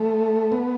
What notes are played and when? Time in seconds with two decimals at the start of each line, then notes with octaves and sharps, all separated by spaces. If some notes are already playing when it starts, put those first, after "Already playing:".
Already playing: A3
0.52 B3